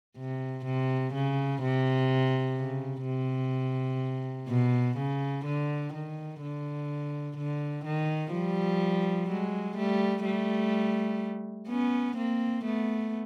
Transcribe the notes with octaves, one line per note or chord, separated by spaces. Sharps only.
C3
C3
C#3
C3
C#3
C3
B2
C#3
D3
D#3
D3
D3
D#3
F3 G3
F#3 G#3
G3 A3
G3 A3
B3 C#4
A#3 C4
A3 B3